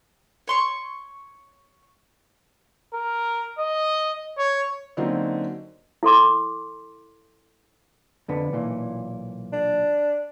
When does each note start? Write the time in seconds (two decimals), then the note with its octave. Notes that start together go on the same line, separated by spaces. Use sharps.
0.47 C#5 C6 C#6
2.93 A#4
3.59 D#5
4.38 C#5
4.97 D3 F#3 A#3 C4 C#4 D#4
6.03 E4 A4 C6 D6
8.28 F2 D3 B3
8.53 B1 A#2 E3
9.53 D4